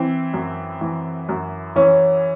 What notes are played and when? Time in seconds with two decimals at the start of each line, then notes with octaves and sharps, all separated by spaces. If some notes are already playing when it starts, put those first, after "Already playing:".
Already playing: E3 C4
0.34 F#2
0.81 E3
1.29 F#2
1.76 E3 C#4